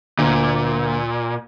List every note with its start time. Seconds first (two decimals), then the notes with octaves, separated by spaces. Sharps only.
0.19 D2 A#2